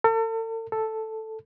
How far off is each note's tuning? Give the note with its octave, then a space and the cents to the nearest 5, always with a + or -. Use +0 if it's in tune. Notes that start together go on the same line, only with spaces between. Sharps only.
A4 +40
A4 +0